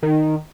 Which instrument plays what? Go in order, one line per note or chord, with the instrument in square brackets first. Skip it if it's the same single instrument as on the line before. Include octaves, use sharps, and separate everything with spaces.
[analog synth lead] D#3